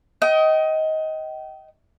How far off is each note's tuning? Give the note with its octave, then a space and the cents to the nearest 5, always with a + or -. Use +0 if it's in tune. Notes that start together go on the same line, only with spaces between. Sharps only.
D#5 +20 G5 -30